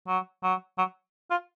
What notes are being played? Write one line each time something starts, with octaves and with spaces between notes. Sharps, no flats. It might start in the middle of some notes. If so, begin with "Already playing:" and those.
F#3
F#3
F#3
F4